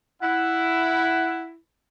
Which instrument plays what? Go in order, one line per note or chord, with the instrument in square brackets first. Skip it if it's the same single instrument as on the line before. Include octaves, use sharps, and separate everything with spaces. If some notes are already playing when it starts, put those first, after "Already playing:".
[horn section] E4 [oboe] F#5